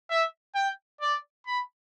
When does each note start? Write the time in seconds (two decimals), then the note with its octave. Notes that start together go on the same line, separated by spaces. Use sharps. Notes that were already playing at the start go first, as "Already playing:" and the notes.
0.10 E5
0.55 G5
1.01 D5
1.46 B5